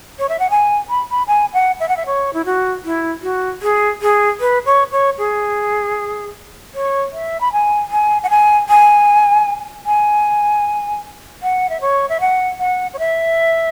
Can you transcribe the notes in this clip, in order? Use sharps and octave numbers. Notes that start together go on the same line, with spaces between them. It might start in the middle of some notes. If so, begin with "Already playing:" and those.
C#5
E5
F#5
G#5
B5
B5
G#5
F#5
E5
F#5
E5
C#5
E4
F#4
E4
F#4
G#4
G#4
B4
C#5
C#5
G#4
C#5
E5
B5
G#5
G#5
F#5
G#5
G#5
G#5
F#5
E5
C#5
E5
F#5
F#5
C#5
E5